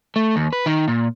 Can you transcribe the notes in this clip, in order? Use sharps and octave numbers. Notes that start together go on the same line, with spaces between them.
A3
D#2
B4
D#3
A#2